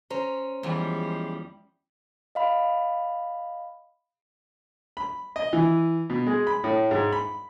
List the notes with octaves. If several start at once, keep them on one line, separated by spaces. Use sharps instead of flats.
C#4 C5 A#5
E2 F3 G3 G#3
D#5 F5 B5
B5
D#5
E3
B2
G#3
B5
A2
G#2
B5